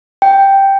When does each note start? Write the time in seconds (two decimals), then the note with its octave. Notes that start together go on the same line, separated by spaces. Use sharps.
0.22 G5